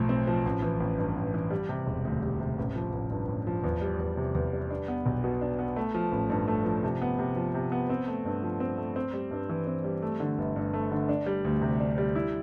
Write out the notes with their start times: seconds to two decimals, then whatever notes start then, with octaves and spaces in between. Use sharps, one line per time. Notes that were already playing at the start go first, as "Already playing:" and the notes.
Already playing: B1 A2 F3
0.09 C4
0.27 F3
0.45 A1
0.62 E3
0.80 A1
0.98 G2
1.16 A1
1.34 E3
1.51 G3
1.69 C3
1.87 E1
2.05 D2
2.22 G3
2.40 C3
2.58 A1
2.76 F3
2.93 A1
3.10 G2
3.28 A1
3.47 F3
3.64 E2
3.82 G3
3.99 E2
4.17 C3
4.35 E2
4.53 G3
4.71 D4
4.88 B3
5.06 B1
5.24 B2
5.41 D4
5.59 B3
5.76 A3
5.94 F3
6.12 A1
6.30 G2
6.48 A3
6.65 F3
6.83 C3
7.02 B3
7.19 C3
7.36 F3
7.54 C3
7.72 B3
7.89 C4
8.07 A3
8.25 G2
8.43 F3
8.60 C4
8.78 A3
8.96 C4
9.14 G3
9.31 G2
9.50 E3
9.67 C4
9.84 G3
10.02 A3
10.20 D3
10.38 G1
10.56 G2
10.74 A3
10.92 D3
11.09 D4
11.26 G3
11.45 D2
11.62 C3
11.80 D4
11.98 G3
12.15 E4